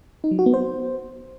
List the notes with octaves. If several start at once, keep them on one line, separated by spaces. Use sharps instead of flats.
D#4
F#3
F#4
B3
C5